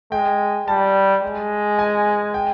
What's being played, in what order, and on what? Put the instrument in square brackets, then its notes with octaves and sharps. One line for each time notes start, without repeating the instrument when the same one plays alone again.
[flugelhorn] G#3 [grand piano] G5
[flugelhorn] G3 [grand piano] A5
[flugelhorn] G#3
[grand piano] G#5
G5